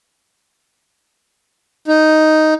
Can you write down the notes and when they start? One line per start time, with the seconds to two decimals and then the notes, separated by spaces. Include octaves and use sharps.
1.88 D#4